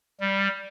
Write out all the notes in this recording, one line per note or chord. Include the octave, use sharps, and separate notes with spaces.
G3